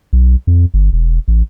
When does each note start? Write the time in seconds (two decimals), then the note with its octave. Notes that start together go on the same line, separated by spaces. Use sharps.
0.13 B1
0.47 F2
0.74 G1
0.93 E1
1.28 A1